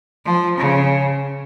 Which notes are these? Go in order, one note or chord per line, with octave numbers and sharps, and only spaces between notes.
F3
C#3